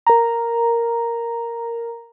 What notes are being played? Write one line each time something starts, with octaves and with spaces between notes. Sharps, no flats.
A#4 A#5